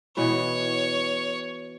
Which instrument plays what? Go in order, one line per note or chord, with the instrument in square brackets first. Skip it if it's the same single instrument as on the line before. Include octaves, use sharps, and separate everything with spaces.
[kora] B2 E3 B3 [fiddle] C#5